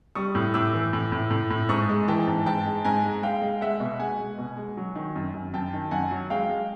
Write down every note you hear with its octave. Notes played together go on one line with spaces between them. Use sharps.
G3 C#6 D#6
A2
A2 D6 E6
E3
A2
A2
A2
A2
G#2 C#6 D#6
G#3
E3 G5 A5
G#2
G#2 G5 A5
G#3
G#2 G#5 A#5
G#3
G#3 F5 G5
G#3
G#3 E5 F#5
B2
G#3 F#5 G#5
G#3
B2
G#3
F#3
D#3
F#2
F#2
F#2 G5 A5
D#3
F#2 F#5 G#5
F#3
G#3 F5 G5
G#3